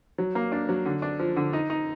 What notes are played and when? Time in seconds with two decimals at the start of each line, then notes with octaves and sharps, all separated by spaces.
0.18 F#3
0.35 A#3
0.52 D4
0.69 F#3
0.85 D3
1.02 D4
1.19 F3
1.36 D3
1.53 D#4
1.70 D#4